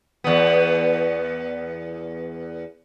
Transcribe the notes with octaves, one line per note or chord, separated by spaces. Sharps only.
E2 B3